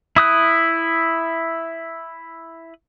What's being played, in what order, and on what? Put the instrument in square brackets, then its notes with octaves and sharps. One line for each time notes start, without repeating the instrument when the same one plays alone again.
[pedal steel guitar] E4 D#6 F#6